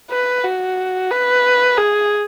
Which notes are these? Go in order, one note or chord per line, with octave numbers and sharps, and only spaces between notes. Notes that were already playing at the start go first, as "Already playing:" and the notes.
B4
F#4
B4
G#4